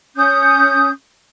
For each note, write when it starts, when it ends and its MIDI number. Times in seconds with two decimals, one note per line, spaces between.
0.15 0.90 61
0.15 0.90 87
0.15 0.90 91